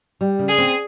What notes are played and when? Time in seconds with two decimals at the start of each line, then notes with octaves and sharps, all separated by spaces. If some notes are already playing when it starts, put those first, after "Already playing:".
0.21 G3
0.39 C#3
0.49 G#4
0.58 C4